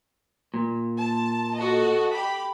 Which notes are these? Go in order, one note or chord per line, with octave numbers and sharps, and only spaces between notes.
A#2
A5
F#4 A4 D#5
G4 B5